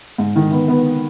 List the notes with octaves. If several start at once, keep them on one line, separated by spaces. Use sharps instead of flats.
G#2
D#3
B3
B3